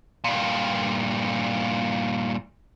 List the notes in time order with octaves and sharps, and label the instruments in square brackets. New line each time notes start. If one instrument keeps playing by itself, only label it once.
[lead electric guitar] G2 A#2